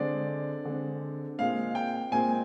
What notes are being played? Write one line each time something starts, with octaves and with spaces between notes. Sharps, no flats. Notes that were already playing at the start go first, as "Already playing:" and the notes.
Already playing: D3 G#3 C4 D5
D3 G#3 C4
A#2 G#3 C4 F5
G5
A#2 G#3 C4 G#5